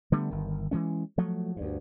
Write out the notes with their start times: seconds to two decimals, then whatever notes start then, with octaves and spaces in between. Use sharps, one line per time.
0.12 D3 G3 A3 B3
0.31 G1 D#3
0.71 E3 G#3 C#4
1.18 F3 F#3 A3
1.56 D2 G2